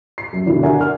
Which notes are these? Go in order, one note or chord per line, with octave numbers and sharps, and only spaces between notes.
C7
F#2
B2 D3 D#3 D4 E4
D4 F#4 A#4 E5 G#5
F6